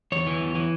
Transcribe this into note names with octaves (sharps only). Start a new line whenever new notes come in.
E2 C#5
E3
E2
E3